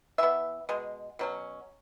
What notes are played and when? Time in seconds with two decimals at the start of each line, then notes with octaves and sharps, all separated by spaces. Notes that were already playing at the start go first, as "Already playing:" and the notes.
0.18 E3 B3 E5
0.69 B2 G#3
1.19 B2 F#3 C#4